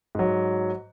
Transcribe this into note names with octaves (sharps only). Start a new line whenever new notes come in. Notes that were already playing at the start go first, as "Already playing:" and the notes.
G#2 F#3